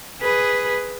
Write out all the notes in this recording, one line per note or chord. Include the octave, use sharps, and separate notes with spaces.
G#4 B4